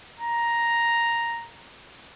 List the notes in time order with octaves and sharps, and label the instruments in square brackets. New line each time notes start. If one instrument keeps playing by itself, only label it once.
[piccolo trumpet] A#5